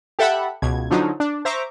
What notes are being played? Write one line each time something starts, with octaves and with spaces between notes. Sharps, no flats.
G4 A4 E5 F#5 B5
C#2 B2 G#6
D3 F3 F#3 D#4
D4
C5 E5 A#5 C#6 D6